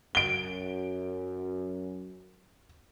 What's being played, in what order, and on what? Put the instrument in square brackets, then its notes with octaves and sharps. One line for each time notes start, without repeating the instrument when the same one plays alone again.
[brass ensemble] F#2 [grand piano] D7 G7